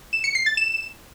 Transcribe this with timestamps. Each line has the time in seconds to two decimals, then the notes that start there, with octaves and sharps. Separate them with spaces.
0.13 E7
0.24 C#7
0.35 C7
0.46 A6
0.57 E7